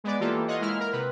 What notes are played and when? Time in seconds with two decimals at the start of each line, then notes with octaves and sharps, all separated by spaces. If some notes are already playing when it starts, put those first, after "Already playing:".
0.04 G#3 B3 D5
0.20 E3 A#3 F4 G4 A4
0.47 F4 C#5 D#5 F#5
0.61 G#3 A#3 E4 F6
0.80 A#4
0.92 C3 B4